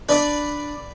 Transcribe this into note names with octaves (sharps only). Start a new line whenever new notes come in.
D4 B4 D5